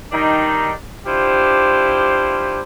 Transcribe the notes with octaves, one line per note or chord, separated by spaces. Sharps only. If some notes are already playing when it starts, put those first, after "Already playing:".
D#3 G3 D4 D#4
D4 E4 F4 G4 C5